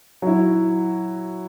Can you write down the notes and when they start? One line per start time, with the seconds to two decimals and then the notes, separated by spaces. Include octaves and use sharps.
0.22 F#3 E4